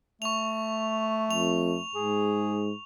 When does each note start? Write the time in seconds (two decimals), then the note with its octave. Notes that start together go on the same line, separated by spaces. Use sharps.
0.22 A3 C#6 F7
1.31 F2 F7
1.95 G#2 G#4